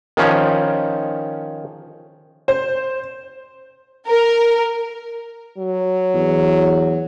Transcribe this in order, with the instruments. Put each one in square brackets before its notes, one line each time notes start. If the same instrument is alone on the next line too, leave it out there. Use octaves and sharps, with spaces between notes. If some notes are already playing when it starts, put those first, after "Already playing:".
[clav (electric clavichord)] D#3 F3 C#4
[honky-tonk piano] C5
[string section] A#4
[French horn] F#3
[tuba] E2